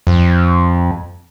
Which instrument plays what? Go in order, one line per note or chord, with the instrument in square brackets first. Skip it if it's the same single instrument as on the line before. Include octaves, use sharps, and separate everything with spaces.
[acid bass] F2